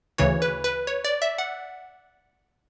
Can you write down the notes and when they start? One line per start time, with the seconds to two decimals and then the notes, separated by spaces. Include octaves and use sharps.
0.18 D2 C#3 E3 C#5
0.42 B4
0.64 B4
0.87 C#5
1.04 D5
1.22 E5
1.38 F#5